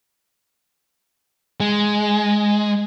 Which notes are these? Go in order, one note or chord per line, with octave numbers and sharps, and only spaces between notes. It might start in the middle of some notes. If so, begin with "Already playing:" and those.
G#3